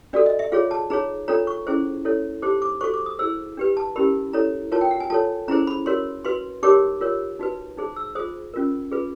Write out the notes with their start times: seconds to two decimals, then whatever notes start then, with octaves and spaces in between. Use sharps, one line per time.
0.13 D4 F#4 A4 D5
0.26 D#5
0.39 E5
0.52 F4 G#4 C#5 F5
0.71 A5
0.90 D#4 G#4 C#5 A#5
1.28 D4 F4 A4 C#5 A#5
1.47 C#6
1.67 C#4 E4 G#4 C5
2.05 E4 A4 C#5
2.42 D#4 G4 C5 D6
2.62 D6
2.81 F#4 A4 C5 C#6
2.94 D6
3.06 D#6
3.19 E4 G#4 C5 E6
3.57 D4 G4 B4
3.77 A5
3.96 C#4 E4 G4 A#4 B5
4.33 E4 A4 C#5 A#5
4.72 F4 A#4 C#5 A5
4.81 G5
4.91 F#5
5.00 G#5
5.10 F4 A4 C#5 A5
5.48 C#4 E4 G#4 C5 A#5
5.67 B5
5.86 F#4 A#4 C#5 C6
6.25 F#4 B4 C6
6.63 D#4 G4 A#4 C#5 D6
7.01 F4 A#4 C#5
7.39 D#4 F#4 B4
7.77 D#4 G#4 C5
7.96 E6
8.15 F4 G#4 C5 D#6
8.54 C#4 F4 A#4
8.91 F4 G#4 B4